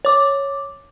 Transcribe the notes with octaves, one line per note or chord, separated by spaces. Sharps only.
C#5 D6